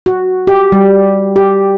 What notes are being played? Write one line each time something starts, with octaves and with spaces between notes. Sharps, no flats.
F#4
G4
G3
G4